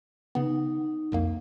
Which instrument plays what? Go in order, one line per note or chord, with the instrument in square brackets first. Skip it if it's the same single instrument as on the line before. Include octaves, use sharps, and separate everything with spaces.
[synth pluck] C#3 B3 [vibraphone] D#4
[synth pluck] C2 F2 A#3